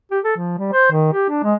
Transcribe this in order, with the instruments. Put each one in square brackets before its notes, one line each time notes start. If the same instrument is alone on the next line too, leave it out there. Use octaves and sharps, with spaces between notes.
[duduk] G4
A4
F3
G3
C5
D#3
G4
D4
G#3